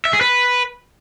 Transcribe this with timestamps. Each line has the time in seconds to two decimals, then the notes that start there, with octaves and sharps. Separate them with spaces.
0.05 E5
0.13 G#4
0.21 B4